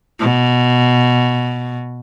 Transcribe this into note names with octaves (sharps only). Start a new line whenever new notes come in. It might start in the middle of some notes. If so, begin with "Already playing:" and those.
B2